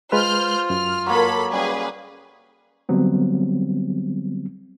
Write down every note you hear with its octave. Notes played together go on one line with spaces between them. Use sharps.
G#3 F4 B4 C5 F6 G6
F#2 F6
F#3 A#3 A4 B5
C#3 G3 G#4 B4
D3 F#3 G3 B3 C4